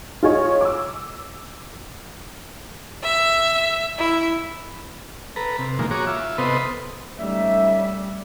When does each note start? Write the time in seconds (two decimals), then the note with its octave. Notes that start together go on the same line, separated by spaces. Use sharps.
0.23 F4 G#4 C#5 D#5
0.61 D6 E6
3.02 E5
3.99 E4
5.36 A4 B4 A#5
5.58 C3
5.79 A#2 D#3 F3 G#3 A#3
5.91 F#4 G#4 C#5 A#5 D6
6.07 F4 E5
6.38 C3 B3 A4 B4 C5 D#5
7.19 G3 A3 C#4 D#4 E5